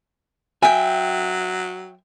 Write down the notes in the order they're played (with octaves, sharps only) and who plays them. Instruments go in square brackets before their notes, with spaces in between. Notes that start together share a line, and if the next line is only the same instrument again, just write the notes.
[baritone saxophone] F#3 [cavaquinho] E5 G5 [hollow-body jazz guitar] G#5